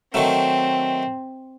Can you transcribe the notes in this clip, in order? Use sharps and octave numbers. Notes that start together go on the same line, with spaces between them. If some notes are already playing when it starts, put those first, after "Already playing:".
D#3 F#3 A3 C4